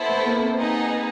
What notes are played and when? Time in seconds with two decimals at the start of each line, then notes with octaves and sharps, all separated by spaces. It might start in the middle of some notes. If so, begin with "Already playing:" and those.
Already playing: B3 E4 A4 C5
0.09 A3
0.26 A#3
0.41 C4
0.57 B3 D#4 G#4